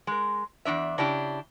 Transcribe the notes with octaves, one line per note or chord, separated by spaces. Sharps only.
G#3 A#4
E2 D#3 D4 E5
C#3 D4 E4 G4